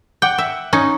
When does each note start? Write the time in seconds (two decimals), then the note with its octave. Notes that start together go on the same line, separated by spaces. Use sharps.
0.22 F#5 G5 D6 G6
0.38 E5
0.73 C#4 D#4